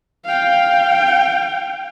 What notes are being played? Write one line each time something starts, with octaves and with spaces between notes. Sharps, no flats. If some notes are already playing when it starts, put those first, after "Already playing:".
F5 G5